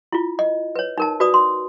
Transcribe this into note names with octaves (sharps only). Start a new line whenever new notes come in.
E4 F4
D#5
B4 C#5
D#4 A#4 A5
F#4 B4 D5 D#6
C6